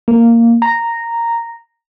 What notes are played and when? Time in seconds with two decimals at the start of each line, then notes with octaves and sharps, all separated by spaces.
0.08 A#3
0.62 A#5